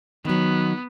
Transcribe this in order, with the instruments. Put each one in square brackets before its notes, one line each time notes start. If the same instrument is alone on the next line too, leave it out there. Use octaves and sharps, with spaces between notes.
[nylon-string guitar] D#3 F#3 [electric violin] B3